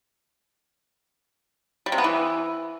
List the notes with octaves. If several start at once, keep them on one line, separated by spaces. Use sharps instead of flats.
G3
C3
B3
E3